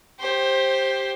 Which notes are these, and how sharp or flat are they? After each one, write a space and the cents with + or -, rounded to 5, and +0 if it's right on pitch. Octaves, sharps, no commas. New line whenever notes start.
G4 +0 C5 +15